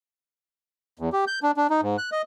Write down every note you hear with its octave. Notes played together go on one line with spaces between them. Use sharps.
E2
G4
G6
D4
D4
D#4
G#2
F#6
D#5